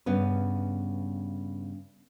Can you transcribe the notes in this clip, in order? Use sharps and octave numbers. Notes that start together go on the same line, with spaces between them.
G2 C#3 B3 C#4